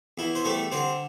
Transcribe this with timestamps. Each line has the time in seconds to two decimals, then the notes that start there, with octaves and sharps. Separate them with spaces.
0.18 E2 E4
0.35 C5
0.45 G3 A3 A4
0.72 D3 C4 C5